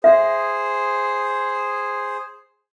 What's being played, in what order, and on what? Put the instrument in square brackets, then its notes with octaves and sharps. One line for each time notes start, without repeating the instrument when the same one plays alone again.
[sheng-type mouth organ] G#4 C5 [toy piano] E5